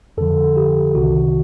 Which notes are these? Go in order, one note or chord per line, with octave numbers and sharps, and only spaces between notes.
F2 D3 F3 A4
G4
C2 C3 D#3 F#4